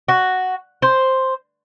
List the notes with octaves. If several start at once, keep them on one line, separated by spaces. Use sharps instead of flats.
F#4
C5